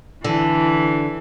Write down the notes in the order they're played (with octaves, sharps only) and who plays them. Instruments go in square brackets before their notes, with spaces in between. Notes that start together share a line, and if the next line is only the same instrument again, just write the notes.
[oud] D3 [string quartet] E3